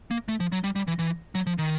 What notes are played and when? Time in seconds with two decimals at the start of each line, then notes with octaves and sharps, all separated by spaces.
0.11 A#3
0.28 A3
0.40 F3
0.52 F#3
0.64 G3
0.76 G3
0.88 E3
0.99 E3
1.35 F#3
1.47 F3
1.58 D#3